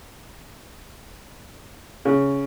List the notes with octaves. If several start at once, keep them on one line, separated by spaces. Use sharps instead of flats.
C#3